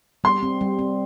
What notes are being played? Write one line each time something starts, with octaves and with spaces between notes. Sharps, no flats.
G3 C6
C4
G3
C4